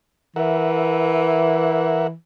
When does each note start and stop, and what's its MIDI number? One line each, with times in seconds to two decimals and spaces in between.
0.36 2.13 52
0.36 2.07 70
0.36 2.07 76
0.36 2.07 78